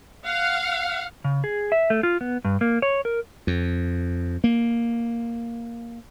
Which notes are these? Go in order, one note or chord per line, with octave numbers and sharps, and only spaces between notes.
F5 F#5
C#3
G#4
E5
A3
F4
B3
G2
A#3
C#5
A#4
F2
A#3